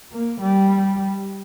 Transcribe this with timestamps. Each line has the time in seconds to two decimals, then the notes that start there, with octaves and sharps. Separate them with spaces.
0.13 A#3
0.41 G3